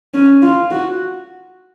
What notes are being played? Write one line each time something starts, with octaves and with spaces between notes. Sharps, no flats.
C#4
F4
F#4